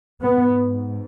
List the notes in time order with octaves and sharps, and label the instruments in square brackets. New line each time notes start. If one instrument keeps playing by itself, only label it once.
[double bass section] G#2 B3